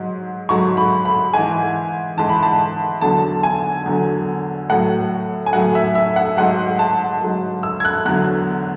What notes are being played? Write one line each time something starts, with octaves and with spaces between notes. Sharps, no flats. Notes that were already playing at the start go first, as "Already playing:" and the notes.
Already playing: G#2 F#3
G#2 F#3 C#6
B5
B5
G#2 E3 G#5
G#2 E3 A5
B5
A5
E2 D3 F#3 A5
G#5
E2 D3 F#3
A2 F#3 F#5
G#5
A2 F#3 F#5
E5
E5
F#5
G#2 F#3 F#5
A5
G#2 F#3
E6
G#6
F#6
E2 D3 F#3 F#6